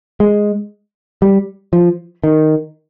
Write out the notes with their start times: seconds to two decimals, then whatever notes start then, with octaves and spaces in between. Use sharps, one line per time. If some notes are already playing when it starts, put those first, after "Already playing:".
0.20 G#3
1.22 G3
1.73 F3
2.24 D#3